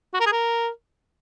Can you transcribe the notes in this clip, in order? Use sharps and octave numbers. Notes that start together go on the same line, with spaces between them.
F#4
A#4
G#4
A#4